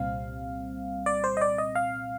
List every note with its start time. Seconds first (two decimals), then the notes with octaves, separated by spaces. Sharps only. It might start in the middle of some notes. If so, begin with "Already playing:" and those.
Already playing: C2 A#2 G3 C4 F5
1.06 D5
1.24 C5
1.37 D#5
1.41 D5
1.58 D#5
1.75 F5